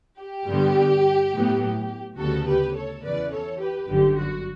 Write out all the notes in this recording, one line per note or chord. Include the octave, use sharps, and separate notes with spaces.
G4
G2 D3 G3 B3
A2 F#3 B3
D2 C#3 G3 B3 F#4 A4
G4 B4
A4 C#5
E2 C#3 E3 B4 D5
A4 C#5
G4 B4
G1 F#2 D3 G4
F#4